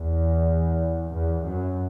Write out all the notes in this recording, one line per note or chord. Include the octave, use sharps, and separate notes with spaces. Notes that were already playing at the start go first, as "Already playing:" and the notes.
Already playing: E2
E2
F#2